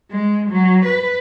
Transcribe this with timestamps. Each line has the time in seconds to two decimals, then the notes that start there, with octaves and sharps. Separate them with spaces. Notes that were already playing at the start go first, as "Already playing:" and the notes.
0.11 G#3
0.51 F#3
0.86 B4